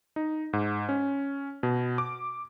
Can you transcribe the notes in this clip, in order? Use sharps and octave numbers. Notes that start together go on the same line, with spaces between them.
D#4
G#2
C#4
B2
D6